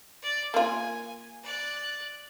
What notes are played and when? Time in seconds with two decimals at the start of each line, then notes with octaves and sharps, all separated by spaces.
0.22 D5
0.54 A#3 F4 G#5
1.43 D5 F#6